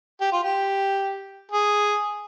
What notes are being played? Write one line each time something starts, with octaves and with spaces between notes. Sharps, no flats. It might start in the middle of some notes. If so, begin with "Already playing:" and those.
G4
F4
G4
G#4